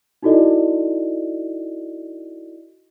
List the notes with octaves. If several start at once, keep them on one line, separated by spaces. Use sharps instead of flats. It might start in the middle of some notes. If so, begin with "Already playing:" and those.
D#4 E4 F#4 A4 D5 D#5